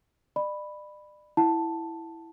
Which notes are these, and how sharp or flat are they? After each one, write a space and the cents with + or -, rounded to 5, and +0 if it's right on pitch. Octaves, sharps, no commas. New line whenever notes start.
D5 +35 B5 +0
E4 +0 F#5 +0 A5 +0